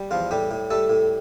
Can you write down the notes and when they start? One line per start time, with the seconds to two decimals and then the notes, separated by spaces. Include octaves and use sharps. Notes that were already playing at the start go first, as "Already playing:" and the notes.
Already playing: G3
0.11 E2 F3 F4
0.31 A2 G3 G4
0.51 A2
0.70 G3 A3 A4
0.90 A2